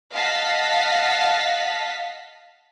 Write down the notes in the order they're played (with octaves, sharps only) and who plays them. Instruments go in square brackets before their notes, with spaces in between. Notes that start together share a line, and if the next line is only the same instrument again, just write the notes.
[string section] D#5 F5 F#5 A5 B6